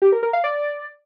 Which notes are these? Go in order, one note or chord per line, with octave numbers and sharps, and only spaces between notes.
G4
A#4
A#4
F5
D5